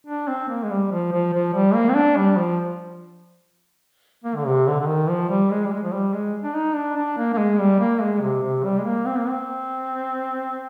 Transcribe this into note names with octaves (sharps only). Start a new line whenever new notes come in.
D4
C4
A#3
G#3
G3
F3
F3
F3
G3
A#3
C4
D4
G3
F3
A#3
D3
C3
D3
D3
D#3
F3
G3
G#3
G3
G#3
F3
G3
G#3
D4
D#4
D4
D4
A#3
A#3
G#3
G3
A#3
G#3
C3
C3
G3
G#3
A#3
C4
A#3
C4